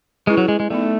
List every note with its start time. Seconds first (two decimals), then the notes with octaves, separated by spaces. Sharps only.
0.27 G#3 C#4 E4 G#4 B4
0.37 F#3
0.48 G#3
0.60 G#3
0.70 F#3 A3 B3 D#4